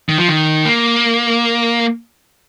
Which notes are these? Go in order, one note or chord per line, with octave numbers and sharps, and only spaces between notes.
D#3
F3
D#3
A#3